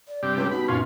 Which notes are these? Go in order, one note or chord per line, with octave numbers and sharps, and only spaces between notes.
D5
G2 C3 G4
C#2 B4
B2 D#4 B5
F#2 A#2 C#4 F4 C6